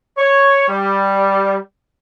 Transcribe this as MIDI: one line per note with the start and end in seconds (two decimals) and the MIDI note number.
0.18 0.65 73
0.68 1.56 55